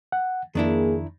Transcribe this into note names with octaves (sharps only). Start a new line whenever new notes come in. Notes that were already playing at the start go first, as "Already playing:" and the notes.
F#5
F2 D#3 A#3 D4 E4 G#4